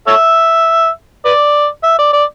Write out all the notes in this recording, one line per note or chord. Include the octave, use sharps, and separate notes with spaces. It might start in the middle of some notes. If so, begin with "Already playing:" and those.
A4 C#5 E5
B4 D5
E5
D5
D5